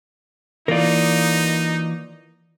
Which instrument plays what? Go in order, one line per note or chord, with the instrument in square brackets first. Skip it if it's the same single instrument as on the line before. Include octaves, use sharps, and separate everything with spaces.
[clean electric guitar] E3 A#3 F4 [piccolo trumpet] D#4 [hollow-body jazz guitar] A#4 D5